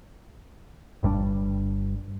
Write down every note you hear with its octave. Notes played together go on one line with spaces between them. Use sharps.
G1 G2 G3 D4